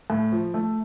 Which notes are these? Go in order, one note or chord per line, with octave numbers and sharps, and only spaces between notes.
A2
F3
A3